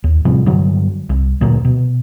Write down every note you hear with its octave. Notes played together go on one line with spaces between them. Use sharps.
D#2
A2 C3 F3 G3
G2 D3 F#3
C2
D2 A#2 F#3 A#3
B2